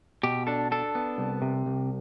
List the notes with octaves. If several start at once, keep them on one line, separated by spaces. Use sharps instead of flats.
B2 G4
D4 A4
D4 A4
B3
C2
C3
C2